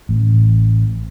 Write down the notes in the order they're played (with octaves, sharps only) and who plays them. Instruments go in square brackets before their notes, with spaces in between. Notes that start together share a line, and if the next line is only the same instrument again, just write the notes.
[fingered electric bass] A1